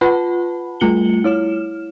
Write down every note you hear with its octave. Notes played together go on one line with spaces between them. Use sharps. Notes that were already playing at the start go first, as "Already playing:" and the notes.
F4 B4 F#5 A5 B5
G3 A3 F4 C#7 F#7 G7
E4 C#5 F6 E7